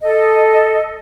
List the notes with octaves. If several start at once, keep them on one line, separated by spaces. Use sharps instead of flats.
A4 D#5